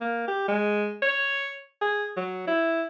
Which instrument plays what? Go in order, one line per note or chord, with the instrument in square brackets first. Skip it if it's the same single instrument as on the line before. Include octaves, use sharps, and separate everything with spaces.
[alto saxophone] A#3
G4
G#3
C#5
G#4
F#3
E4